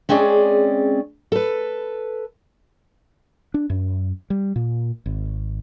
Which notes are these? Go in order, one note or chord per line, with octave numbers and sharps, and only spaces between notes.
G#3 C4 C#4 G#4 D5
A4 B4
D4
F#2
G3
A#2
G#1